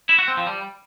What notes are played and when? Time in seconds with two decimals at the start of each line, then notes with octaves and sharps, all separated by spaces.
0.09 E4
0.19 F#4
0.28 C4
0.37 F3
0.47 G3